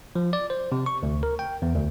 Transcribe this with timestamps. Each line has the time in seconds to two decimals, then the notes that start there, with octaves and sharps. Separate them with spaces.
0.15 F3
0.33 D5
0.50 C5
0.72 C3
0.86 C#6
1.03 D2
1.23 A#4
1.39 G5
1.62 E2
1.75 D2